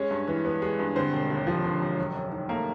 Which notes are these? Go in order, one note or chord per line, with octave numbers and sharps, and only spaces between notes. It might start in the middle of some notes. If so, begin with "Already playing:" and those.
Already playing: G#3 C#4 C#5
G2
E3
B3
G#3
G2
D3 C4 C5
E1
D#2
F3
D3
E1
F#3
F#2
D#3
A3 A#3 A#4